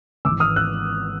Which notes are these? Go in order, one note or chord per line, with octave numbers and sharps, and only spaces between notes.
G#1 G#2 E3 D6 E6
D#6 F6
E6 F#6